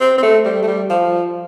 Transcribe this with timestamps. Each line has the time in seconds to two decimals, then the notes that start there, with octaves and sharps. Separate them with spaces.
0.01 C4
0.18 C4
0.23 A3
0.45 G3
0.63 A3
0.68 G3
0.90 F3